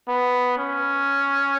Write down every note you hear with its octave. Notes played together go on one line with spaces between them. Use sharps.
B3
C#4